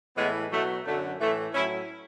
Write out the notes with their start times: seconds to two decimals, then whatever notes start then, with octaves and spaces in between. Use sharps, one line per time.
0.17 A2 E3 G#3 B3
0.51 B2 F#3 A3
0.86 F#2 D3 F#3 A3
1.19 A2 E3 A3
1.54 A2 F#3 C#4 E4